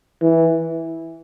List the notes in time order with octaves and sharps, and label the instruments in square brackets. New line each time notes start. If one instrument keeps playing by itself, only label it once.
[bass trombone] E3